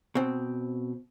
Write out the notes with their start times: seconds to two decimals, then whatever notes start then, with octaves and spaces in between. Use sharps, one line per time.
0.15 B2 C4